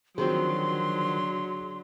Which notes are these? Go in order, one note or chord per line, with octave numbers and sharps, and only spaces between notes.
D3 D#3 F3 F#3 C4 F#4 G#4 C6